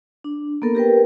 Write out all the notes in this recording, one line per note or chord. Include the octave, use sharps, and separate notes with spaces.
D4
A#3 B3 A4 A#4
G4 A#4 B4 G5